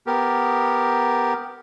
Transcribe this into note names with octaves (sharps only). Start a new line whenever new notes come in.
B3 G4 A#4